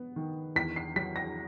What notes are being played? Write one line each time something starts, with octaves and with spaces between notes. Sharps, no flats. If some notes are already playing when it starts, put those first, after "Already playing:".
Already playing: B3
D#3
E2 B6
C7
F#3 B6
A#6